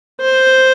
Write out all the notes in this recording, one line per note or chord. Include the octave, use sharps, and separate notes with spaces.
C5